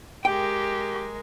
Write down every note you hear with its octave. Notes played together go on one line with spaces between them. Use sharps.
G#3 G4 A#4 G5